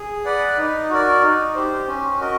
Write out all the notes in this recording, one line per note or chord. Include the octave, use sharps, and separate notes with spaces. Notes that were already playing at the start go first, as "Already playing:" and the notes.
Already playing: G#4
B4 D5 F#5
D#4
F#4 A#4 D5
D#4
G4 C5
C#4
F#4 A#4 D#5